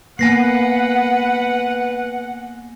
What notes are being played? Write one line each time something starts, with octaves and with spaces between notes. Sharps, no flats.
A#3 B3 B4 F#5 G#5 A#6 C7